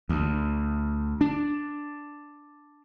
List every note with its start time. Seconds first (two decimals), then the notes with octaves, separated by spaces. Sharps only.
0.09 D2
1.21 D4